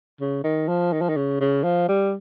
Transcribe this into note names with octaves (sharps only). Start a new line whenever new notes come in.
C#3
D#3
F3
D#3
F3
D#3
C#3
C#3
F3
G3